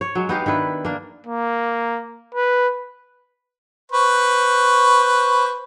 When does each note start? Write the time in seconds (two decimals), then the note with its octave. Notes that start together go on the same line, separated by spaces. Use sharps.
0.01 C#5
0.15 F#3 G#3
0.29 B3 D#4 G4 F5
0.46 D#3 D4 E4 B4
0.85 A#3 D4
1.27 A#3
2.35 B4
3.92 B4 C5 C#6